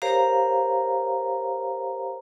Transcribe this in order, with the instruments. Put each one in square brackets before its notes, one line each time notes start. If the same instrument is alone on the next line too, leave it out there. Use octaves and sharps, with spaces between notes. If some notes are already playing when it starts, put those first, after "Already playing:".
[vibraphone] G4 A#4 C5 C#5 F5 A#5